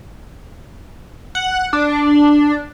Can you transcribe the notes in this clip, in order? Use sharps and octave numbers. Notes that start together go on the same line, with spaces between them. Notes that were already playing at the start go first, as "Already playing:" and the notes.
F#5
D4